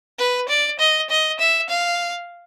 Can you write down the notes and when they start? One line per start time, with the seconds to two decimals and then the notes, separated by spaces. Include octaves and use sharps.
0.18 B4
0.48 D5
0.79 D#5
1.10 D#5
1.39 E5
1.69 F5